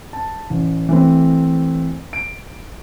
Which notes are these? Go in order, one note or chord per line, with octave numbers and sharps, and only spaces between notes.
A5
A1
E3 A3 C4
D7